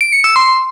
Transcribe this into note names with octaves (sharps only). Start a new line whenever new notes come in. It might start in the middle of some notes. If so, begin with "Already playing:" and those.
D7
C#7
E6
C6